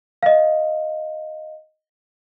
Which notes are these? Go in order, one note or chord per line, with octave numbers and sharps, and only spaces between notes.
D#5 F5